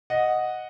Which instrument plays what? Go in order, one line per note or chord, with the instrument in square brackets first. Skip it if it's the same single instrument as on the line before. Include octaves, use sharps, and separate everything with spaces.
[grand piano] D#5 F#5